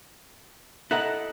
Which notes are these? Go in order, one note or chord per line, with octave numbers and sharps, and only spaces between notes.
E4 A4 D#5 E5 F#5 A#5 F#6